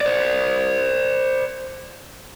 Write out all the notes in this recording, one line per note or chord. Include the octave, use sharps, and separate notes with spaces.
C5 D5